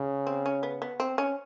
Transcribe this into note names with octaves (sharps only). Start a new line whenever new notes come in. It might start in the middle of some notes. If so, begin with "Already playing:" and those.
Already playing: C#3
C4
C#4
B3
B3
C4
C#4